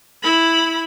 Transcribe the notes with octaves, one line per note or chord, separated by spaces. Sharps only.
E4 B5